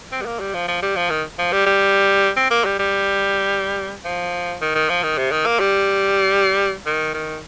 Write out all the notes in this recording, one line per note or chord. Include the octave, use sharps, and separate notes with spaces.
C4
G3
A#3
G3
F3
F3
G3
F3
D#3
F3
G3
G3
C4
A#3
G3
G3
F3
D#3
D#3
F3
D#3
C3
D#3
A#3
G3
D#3
D#3